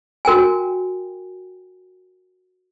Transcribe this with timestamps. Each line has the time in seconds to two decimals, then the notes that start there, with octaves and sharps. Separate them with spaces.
0.25 F#4 A#4 G5 G#5